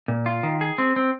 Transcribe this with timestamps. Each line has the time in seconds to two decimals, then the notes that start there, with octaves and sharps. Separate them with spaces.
0.08 A#2
0.26 F4
0.43 D#3
0.61 G#4
0.78 C4
0.96 C4